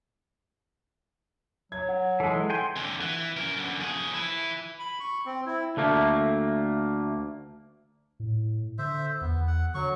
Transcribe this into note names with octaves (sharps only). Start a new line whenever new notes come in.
F#3 G#6
F#5
E3 G#3 A4
G5 G#5 C6
F2 D3
E3
F#2 A#4
F#2 D3
F3 G#4
E3 E4
B5
C#6
C4
E4
D2 A3 A#3
A2
D3 C5 E5
E2 B3
F#5
D3 F#3 C#6